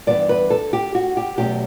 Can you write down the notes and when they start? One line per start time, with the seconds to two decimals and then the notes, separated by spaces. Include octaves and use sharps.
0.07 G2 E3 G3 B3 D5
0.29 B4
0.50 A4
0.73 G4
0.95 F#4
1.17 G4
1.38 E2 B2 F#3 A3 C#4 G4